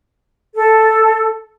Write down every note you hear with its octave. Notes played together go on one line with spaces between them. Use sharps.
A4